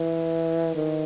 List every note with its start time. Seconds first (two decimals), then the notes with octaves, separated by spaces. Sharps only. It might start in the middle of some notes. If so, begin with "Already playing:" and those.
Already playing: E3
0.75 D#3